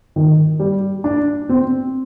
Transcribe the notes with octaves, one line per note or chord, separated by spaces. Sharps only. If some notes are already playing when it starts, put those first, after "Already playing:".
D#3
G3
D4
C4